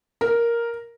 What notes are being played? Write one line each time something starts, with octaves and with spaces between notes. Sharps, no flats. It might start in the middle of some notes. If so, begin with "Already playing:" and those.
A#4